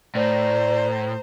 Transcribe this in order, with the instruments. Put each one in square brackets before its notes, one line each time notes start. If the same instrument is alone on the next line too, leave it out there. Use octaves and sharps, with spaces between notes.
[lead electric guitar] A2 [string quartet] C5 A#5 [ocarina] D5